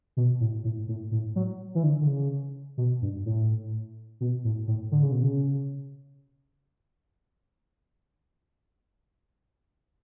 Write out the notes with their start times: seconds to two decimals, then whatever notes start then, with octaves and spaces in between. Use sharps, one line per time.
0.17 B2
0.40 A2
0.64 A2
0.88 A2
1.11 A2
1.36 F#3
1.75 E3
1.83 D3
2.01 D3
2.07 C#3
2.77 B2
3.02 G2
3.26 A2
4.21 B2
4.44 A2
4.68 A2
4.92 D3
5.03 C#3
5.12 B2
5.22 C#3